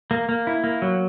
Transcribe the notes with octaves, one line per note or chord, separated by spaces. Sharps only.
A#3
A#3
E4
A#3
F#3